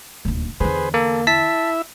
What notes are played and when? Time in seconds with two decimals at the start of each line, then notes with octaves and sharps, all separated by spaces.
0.25 D#1 D2
0.60 E2 D3 G#4 B4 C5
0.94 A#3 A4
1.27 E4 E5 A5 B6